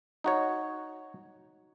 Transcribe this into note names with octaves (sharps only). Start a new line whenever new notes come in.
D#4 F#4 C#5